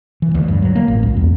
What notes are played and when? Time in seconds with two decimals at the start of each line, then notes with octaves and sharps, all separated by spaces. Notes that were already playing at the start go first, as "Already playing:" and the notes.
0.22 E3
0.35 D2
0.48 G2
0.62 F#3
0.75 A#3
0.88 A1
1.03 C#2
1.17 E2